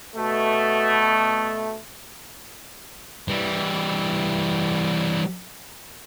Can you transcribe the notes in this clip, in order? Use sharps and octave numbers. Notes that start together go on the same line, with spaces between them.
B2 A3
E3 G3